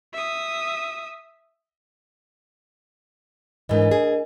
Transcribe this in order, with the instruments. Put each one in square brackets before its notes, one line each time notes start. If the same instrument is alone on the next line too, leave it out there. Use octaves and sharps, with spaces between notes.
[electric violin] E5 D#6
[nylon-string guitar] G#2 E3 [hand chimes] D4 A#4 D#5
[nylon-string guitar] G#4